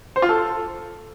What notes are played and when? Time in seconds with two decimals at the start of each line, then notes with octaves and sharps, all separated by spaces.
0.16 C5
0.22 F4
0.29 A4